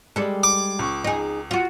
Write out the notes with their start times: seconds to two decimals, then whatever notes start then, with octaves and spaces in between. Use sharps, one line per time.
0.16 G3 G#3 A4 D5
0.44 D6
0.79 C#2 C#6
1.04 D#4 G#4
1.51 F4 F#4